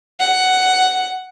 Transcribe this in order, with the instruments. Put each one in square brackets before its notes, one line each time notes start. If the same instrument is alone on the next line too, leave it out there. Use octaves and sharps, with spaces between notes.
[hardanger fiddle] F#5